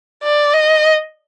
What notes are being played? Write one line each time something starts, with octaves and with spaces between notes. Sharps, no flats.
D5
D#5